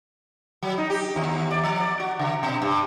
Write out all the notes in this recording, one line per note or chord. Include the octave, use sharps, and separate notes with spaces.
F#3
D#4
G4
D#2
D5
F3
D5
F#4
C#3
B2
G2